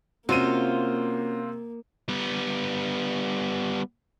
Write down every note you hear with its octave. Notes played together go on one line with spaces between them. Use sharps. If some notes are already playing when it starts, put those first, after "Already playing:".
C3 A#3 C#4 F4 F#4 C5 D#7
G3 B3